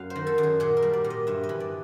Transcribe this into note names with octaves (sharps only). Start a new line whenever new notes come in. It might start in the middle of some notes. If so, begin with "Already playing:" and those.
Already playing: F#2 F5
C5
D#3
A4
F#2
G#4
A#2 G#4
A#4
G3
D5
A#2
D#5
G2 E5
D#5
E3
D5